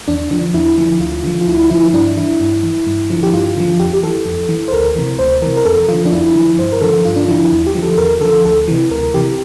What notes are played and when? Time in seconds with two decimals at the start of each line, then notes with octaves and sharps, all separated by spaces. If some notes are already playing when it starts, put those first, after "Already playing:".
0.08 E2 D4
0.31 D3 F3 D4
0.54 E2 E4
0.77 D3 F3
1.00 D2 F4
1.24 D3 F3
1.41 F4
1.47 D2 E4
1.70 D3 F3 E4
1.83 E4
1.93 G2 D4
2.17 E3 E4
2.40 G2
2.63 E3
2.87 G2
3.10 D3 F3
3.23 G4
3.33 G2 F4
3.57 D3 F3
3.79 F2 G4
3.93 G4
4.03 E3 A4
4.26 F2
4.49 E3
4.68 C5
4.72 D2 A#4
4.96 C3 E3
5.19 D2 C5
5.42 C3 E3 A#4
5.57 A#4
5.65 F2 A4
5.88 D3 F3 F4
6.06 D4
6.12 F2 E4
6.35 D3 F3
6.58 G2 C5
6.72 A#4
6.81 D3 F3 A4
7.05 G2 F4
7.16 D4
7.28 D3 F3 E4
7.52 E2
7.67 G4
7.75 D3 F3
7.82 A4
7.98 E2 A#4
8.21 D3 F3 A4
8.45 D2 A4
8.68 C3 E3
8.91 D2 A#4
9.14 C3 E3 G4